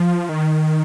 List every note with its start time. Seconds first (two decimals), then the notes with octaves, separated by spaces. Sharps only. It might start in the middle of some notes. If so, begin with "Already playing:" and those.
Already playing: F3
0.29 D#3